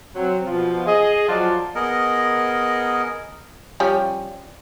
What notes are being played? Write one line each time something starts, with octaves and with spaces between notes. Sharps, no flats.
F#3 C4
B2 F3 F4
G#4 D#5
F3 F#3 F4 D5 F#5 A5
B3 G#4 A#4 D#5
F3 G3 C#4